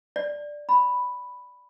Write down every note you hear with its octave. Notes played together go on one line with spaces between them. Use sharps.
D5
B5